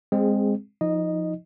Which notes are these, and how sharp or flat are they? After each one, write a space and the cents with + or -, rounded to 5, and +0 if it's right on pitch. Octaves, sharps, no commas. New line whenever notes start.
G#3 -20 C4 +0 G#4 +0
F3 +0 D#4 +20 D#5 -10